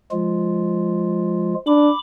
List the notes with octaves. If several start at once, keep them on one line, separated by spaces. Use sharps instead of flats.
F3 G#3 F4
D4 B5 D6